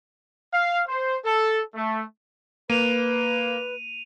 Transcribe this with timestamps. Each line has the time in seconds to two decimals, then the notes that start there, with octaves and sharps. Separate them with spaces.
0.54 F5
0.88 C5
1.25 A4
1.75 A3
2.70 A#3 B4 D#7 F7